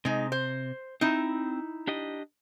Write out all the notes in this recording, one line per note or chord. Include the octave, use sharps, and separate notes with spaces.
C3 G#3 D#4
C5
C4 D#4 E4
D4 G4 D#5